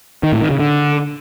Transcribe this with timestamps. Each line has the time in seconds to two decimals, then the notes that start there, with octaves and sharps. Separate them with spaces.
0.23 D#3
0.32 A2
0.41 D#3
0.50 C#3
0.60 D3